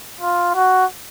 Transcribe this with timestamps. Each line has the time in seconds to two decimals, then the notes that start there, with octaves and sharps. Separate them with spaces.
0.21 F4
0.55 F#4